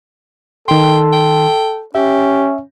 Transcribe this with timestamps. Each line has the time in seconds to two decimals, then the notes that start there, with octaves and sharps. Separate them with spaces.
0.68 D#3 A4 G5 C6
1.13 G5
1.95 C#4 G4 E5